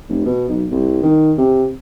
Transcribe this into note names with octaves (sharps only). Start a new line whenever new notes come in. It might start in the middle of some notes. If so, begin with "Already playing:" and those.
F1
B2
B1
C2
D#3
C3